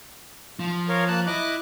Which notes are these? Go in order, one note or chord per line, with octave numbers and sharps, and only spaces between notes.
F3
A#4 C#5 F5
A#3 A5 F#6
E4 D#5 D6 F#6